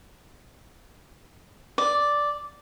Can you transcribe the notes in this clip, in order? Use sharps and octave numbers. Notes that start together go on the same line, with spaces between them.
D5